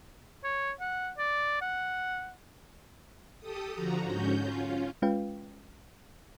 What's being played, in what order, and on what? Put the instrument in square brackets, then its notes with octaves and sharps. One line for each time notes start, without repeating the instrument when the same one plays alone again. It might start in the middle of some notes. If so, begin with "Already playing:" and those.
[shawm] C#5
F#5
D5
F#5
[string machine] G4 A4 D#6
D3 F3 F#4 A#5
G#2 C#4 F#4 G6
C#4 F4
[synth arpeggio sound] G#3 C#4 F4 B4 F5 G5